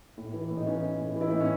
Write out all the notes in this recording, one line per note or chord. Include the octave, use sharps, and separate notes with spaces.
A2
E3
A2
D#4
E3 C#4
E3
A2
E3
E4
A2 D#4
C#4